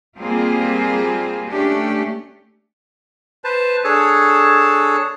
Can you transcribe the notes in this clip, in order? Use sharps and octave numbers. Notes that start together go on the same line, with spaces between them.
G3 A#3 C4 F4 G#4
A3 C#4 D4 G4
B4 C5 A5
D4 G#4 A4 C#5 A5